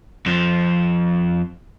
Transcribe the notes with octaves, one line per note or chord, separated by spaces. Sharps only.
F2 F3